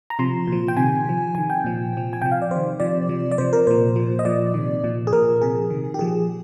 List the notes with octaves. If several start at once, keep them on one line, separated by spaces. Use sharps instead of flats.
A#5
C3 F3 C6
A#2
F3
G5
C3 D#3 G#5
C3 F3
C3 D#3 G#5
G5
A#2 F3
C3 F3
G#5
C3 F3 G5
F5
D5
C3 D#3 C5
C3 F3 D5
C3 F3
D5
C3 F3 C5
A#4
A#2 F3 C5
A#2 F3
D#5
A#2 F3 D5
C3 D#3
A#2 F3
G#4
A#2 F3 A#4
C3 F3 G#4
C3 D#3
G4
A#2 F3 G#4